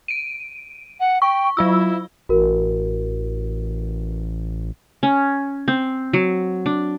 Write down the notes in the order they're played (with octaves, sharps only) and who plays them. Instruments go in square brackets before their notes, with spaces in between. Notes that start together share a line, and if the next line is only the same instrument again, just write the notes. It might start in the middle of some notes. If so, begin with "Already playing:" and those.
[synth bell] D7 D#7
[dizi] F#5
[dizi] G5 [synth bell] C#6
[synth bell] F#3 F4 E6 [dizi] E4
[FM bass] A1 [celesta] F#4 A#4
[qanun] C#4
C4
F#3
D4